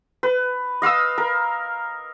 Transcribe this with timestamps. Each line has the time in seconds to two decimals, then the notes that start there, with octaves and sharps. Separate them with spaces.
0.23 B4
0.82 D#5 F5 D#6 E6
1.18 A#4